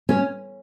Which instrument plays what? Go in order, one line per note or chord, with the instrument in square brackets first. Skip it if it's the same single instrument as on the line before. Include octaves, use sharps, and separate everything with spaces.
[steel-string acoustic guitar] C#4